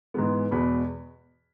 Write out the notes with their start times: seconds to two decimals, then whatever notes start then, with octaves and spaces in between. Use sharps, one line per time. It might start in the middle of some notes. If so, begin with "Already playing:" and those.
0.14 G#2 E3 G#3 B3
0.51 E2 B2 G#3 B5